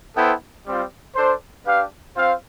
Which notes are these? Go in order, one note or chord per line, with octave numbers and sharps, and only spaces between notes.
B3 E4 A4 C5 G5
G3 C4 F4
D4 A4 C5
D4 G4 B4 F5
C4 F4 C5 F5